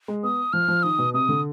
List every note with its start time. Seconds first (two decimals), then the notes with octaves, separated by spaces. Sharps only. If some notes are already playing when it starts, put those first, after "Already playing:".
0.08 G#3
0.23 B3 D#6
0.53 F3 F6
0.68 F3
0.83 D#3 D#6
0.98 B2
1.14 C3 D#6
1.29 D3